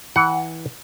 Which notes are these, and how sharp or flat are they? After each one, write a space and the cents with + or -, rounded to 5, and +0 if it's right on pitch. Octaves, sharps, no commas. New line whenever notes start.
E3 -20 F#5 +10